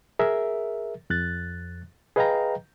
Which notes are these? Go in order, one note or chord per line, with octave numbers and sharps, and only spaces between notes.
G#4 A#4 E5
F2 F#6 A6
G#4 B4 D#5 F5 G5 A#5